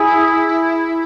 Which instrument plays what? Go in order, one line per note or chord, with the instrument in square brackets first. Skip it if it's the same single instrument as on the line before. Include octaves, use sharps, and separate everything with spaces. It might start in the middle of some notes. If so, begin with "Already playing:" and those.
Already playing: [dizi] E4 [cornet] G#4